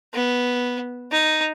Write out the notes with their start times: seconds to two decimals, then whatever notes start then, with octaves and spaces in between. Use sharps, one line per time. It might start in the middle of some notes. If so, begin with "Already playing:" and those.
0.14 B3
1.12 D#4